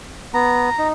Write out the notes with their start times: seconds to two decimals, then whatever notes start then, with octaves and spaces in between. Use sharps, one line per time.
0.34 B3 A#5
0.78 D#4